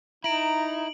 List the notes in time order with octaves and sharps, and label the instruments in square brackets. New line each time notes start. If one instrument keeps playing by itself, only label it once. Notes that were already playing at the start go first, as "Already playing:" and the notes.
[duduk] D#4 [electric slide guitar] E4 [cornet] A#5 [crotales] D7 F#7